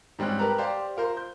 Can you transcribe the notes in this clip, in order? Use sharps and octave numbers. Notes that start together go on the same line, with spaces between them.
G#2 G3 C4 C#4 F#6
G4 A#4 B4 A5 A#5 F#6
G4 C5 D5 F5
F4 A#4 C5
G6